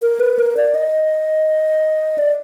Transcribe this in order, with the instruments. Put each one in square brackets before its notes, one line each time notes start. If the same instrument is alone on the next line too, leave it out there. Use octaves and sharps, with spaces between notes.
[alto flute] A#4
B4
A#4
D5
D#5
D5